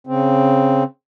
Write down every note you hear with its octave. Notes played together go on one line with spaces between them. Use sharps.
C#3 C4